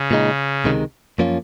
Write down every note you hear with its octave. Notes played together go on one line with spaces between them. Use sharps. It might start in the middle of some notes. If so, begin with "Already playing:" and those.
Already playing: C#3
A#2 G#3 D#4
C#2 C3 D#3 G#3
F#2 F3 A#3 C#4 F4